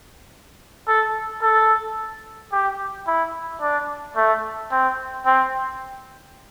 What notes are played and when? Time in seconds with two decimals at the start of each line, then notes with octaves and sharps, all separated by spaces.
0.87 A4
1.42 A4
2.52 G4
3.07 E4
3.61 D4
4.16 A3
4.71 C4
5.26 C4